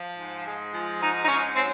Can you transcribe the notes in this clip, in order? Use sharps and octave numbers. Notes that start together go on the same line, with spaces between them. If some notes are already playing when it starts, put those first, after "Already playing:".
Already playing: F3
G#2
G#3
F3
G#2 D#4
D#4
G#2 C#4
F#3 C4